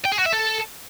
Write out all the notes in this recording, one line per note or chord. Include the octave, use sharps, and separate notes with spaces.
G5
G#4
F#4
E5
A4